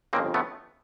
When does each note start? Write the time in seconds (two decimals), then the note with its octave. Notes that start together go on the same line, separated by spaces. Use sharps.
0.13 G1 F2 C#3 A#3 C4
0.34 A3 B3